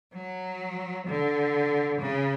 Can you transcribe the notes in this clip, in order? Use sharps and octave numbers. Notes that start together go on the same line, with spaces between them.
F#3
D3
C#3